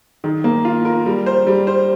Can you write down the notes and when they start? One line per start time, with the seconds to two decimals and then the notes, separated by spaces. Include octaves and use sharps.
0.24 D#3
0.44 A#3
0.65 F4
0.85 A#4
1.06 G3
1.26 C5
1.47 G3
1.67 C5